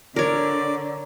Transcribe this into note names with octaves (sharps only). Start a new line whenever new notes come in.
D3 A#4 C#5 D5